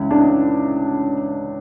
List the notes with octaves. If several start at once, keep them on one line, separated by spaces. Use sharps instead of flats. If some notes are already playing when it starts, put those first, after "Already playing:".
Already playing: C#2 E3 C#4
D4
D#4